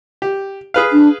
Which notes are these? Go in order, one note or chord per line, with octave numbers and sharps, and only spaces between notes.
G4
G#4 B4 F5
D4